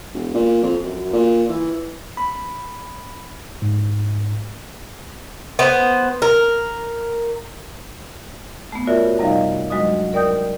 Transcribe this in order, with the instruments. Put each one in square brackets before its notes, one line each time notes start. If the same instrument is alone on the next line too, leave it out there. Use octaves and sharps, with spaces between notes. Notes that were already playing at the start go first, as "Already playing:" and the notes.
[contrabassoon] E1
A#2
F2
F#2
A#2
E3
[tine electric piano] B5
G#2
[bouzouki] B3 C5
A#4
[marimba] A3 B3
F4 F#4 A#4 C#5 D5 E5
F#2 C3 G3 D#4 D#5 F5
D2 F#3 G#3 F#4 D#5 D#6
A#4 D5 G5 D#6 G6